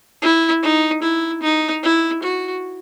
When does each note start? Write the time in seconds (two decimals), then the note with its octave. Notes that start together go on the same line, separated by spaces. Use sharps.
0.22 E4
0.63 D#4
1.03 E4
1.43 D#4
1.83 E4
2.23 F#4